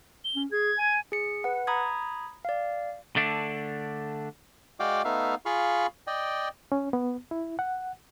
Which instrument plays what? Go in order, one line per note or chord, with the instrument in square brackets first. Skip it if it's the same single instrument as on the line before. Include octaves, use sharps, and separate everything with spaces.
[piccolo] G7
[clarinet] C#4
[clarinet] G#4 [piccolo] G#6
[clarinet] G#5
[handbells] G#4 C#7
B4 F#5
A#5 B5 D#6 G#6
D5 F5
[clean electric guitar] D3 A3 D4
[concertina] G#3 F#4 D5 F5 G5 D6
A3 B3 D#4 E5 F5
F4 G#4 F5 B5 C#6
D5 D#5 G5
[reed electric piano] C#4
B3
E4
F#5